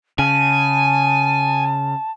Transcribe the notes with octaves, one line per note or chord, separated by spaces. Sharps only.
C#3 G#5 A5